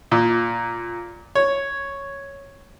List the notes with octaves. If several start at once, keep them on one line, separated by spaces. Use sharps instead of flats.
A#2
C#5